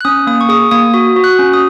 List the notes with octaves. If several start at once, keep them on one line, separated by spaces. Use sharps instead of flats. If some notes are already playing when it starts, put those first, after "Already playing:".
F#6
C#4 D#6
A#3 D#6
C#6
G#4 D#6
A#3 D#6
F#4 D#6
F#4
F#6
C#4
D#6